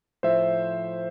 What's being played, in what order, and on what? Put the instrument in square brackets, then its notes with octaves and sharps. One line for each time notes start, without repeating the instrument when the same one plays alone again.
[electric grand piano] A2 F3 C5 E5